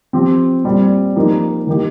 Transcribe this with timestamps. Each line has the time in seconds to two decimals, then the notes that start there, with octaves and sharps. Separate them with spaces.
0.13 F3 C4 G4
0.65 A#2 G3 C4
1.16 F3 A#3 D#4 G4
1.67 D#3 A#3 G4